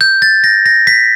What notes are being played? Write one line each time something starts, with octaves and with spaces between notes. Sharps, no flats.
G6
A6
A#6
A#6
B6